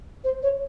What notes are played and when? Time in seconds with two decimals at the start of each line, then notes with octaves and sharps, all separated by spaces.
0.24 C5
0.43 C#5